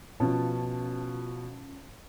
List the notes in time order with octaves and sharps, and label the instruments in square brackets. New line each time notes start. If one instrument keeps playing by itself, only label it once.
[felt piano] B2 F3 [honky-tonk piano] C#4 F4 A5